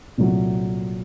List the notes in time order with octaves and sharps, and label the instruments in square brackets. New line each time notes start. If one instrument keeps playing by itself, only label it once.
[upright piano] C2 A#2 F#3 A3